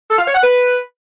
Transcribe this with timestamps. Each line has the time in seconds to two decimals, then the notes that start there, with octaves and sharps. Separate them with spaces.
0.10 A4
0.18 F5
0.26 C#5
0.34 F#5
0.43 B4